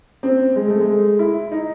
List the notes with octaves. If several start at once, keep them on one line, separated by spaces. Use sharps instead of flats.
C4
G#3
A3
G#3
E4
D#4